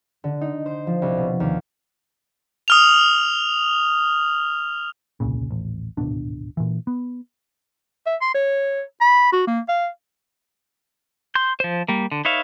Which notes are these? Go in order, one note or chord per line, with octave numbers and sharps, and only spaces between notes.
D3
D#4
C5
F3
C2
B2
D#2
D#6 F6 F7
D#1 C2 A#2 C#3
D#1 A1
D1 G#1 B2 D4
A#2 E3
B3
E5
C6
C#5
B5
F#4
A#3
F5
C6 G6
F3 C5
G3 A#3
D3
D#4 B4 C#5 E5 F5